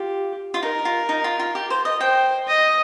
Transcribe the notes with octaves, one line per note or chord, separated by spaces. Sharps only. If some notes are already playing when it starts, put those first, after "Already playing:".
Already playing: F4 G4
F4
D#4 A#4
F4
D#4
F4
F4
G4
C5
D#5
C5 G5
D#5